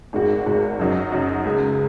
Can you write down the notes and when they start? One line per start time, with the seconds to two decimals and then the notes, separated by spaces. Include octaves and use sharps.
0.13 G#1 G#2 G#3 F#4
0.46 G#1 G#2 G#3 F#4
0.79 F#2 F#3 D#4 F#4
1.12 F#2 F#3 D#4 F#4
1.45 C#2 C#3 G#3